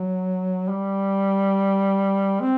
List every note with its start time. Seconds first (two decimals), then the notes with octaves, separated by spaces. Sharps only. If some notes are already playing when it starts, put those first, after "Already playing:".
Already playing: F#3
0.69 G3
2.42 C4